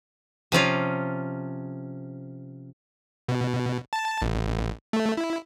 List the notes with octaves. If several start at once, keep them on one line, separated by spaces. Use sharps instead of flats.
C3 F3 C#4 F4
B2
A5
A1
A3
E4